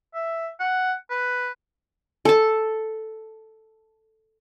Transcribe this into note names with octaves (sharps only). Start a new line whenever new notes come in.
E5
F#5
B4
A4 A5